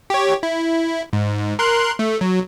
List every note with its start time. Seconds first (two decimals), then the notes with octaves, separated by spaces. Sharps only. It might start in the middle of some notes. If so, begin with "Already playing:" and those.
0.10 G4 C#5
0.43 E4
1.13 G#2
1.59 A#4 C6 F#6
1.99 A3
2.21 F#3